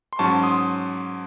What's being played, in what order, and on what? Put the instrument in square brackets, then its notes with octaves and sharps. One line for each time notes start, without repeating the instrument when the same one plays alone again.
[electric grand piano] C6
G#2 F#3 C#4 A5 C#6
C6 D#6